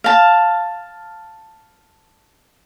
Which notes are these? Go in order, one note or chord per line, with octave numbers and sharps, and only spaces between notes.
F5 A5